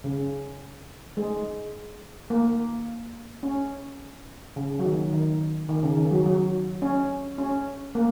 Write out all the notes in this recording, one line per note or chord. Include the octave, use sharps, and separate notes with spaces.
C#3
G#3
A#3
C#4
C#3
F#3
D#3
D#3
D#3
C#3
D#3
F#3
F#3
C#4
C#4
A#3